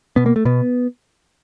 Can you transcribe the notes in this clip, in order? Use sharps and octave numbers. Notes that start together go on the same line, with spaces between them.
B2 B3
A#3
A3
B2 B3